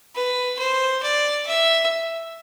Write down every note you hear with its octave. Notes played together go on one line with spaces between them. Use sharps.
B4
C5
D5
E5